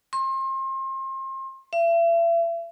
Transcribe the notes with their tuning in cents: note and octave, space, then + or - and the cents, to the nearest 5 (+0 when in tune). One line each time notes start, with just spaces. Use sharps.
C6 +35
E5 +40